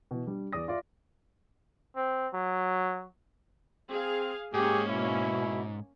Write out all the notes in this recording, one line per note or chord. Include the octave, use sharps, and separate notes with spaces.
B2 E3
G3 D4
E2 D5 D#6 A#6
F4 D5 E5
C4
F#3
C4 G#4 F5
G#2 A#3 C#4 G4 G#4
B2 E4